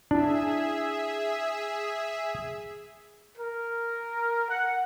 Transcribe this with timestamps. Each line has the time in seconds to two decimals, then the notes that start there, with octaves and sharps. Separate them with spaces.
0.11 D4 E4 G#4 E5
3.37 A#4
4.49 F#5